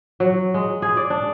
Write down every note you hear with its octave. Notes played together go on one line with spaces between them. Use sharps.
F#3
G#3
G#4
D5
D4